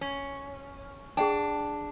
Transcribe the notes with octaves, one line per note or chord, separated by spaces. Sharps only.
C#4
D4 G#4 F#5 G5